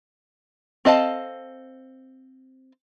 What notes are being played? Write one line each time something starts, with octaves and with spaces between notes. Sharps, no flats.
C4 A4 D#5 F5 A5